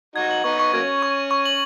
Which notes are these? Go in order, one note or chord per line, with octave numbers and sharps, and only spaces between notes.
D#4 F#4 G#6
F#7
B3 D#4 C#6
C#6
F#3 A#3 C#4 G#6
G#6
C#6
D#7
C#6
F#7